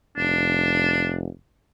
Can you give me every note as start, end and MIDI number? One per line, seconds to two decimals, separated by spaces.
0.17 1.27 29
0.17 1.15 62